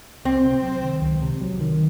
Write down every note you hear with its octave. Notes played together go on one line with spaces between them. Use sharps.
C#2 C4
C3
F#3
D#3
C#2
C3
F#3
D#3